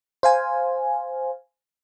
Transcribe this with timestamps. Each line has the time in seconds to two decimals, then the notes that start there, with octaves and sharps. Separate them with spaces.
0.23 C5 F5 G#5